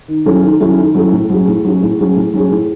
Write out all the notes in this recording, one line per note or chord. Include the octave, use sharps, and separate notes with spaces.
D#3
F#3 C#4 E4 A4
D#3
F#3 C#4 E4 A4
D#3
F#3 C#4 E4 A4
A2
F#3 C#4 G#4
A2
F#3 C#4 G#4
A2
F#3 C#4 G#4
A2
F#3 C#4 G#4
A2